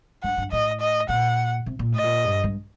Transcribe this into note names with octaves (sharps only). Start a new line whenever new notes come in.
G2 F#5
G2
A2 D#5
D#5
A#2 F#5
C3
A#2
A2 D#5
A#2
G2
G2